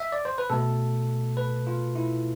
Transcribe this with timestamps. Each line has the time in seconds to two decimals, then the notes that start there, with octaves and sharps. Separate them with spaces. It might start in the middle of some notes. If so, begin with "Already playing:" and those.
0.00 E5
0.12 D5
0.25 C5
0.38 B4
0.50 B2 A3 A4
1.37 B4
1.67 F4
1.96 E4